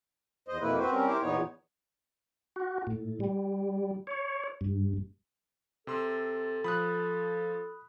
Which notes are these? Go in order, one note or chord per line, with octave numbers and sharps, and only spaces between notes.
E2 C5 D#5
F2 B2 A#3 E4 B4
C4 F#4 B4 C5
G3 C4 C#4 A#4
E4 G4 A#4 C5
E2 A#2 B3 D#4 C#5
F#4
A2
G3
C#5
G2
C3 A4 C6 E6
F3 B5 D#6 F#6